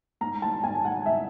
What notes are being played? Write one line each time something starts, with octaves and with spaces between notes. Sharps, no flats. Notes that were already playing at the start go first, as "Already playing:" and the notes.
G#2 A#5
A5
G#2 G#5
F#5
E5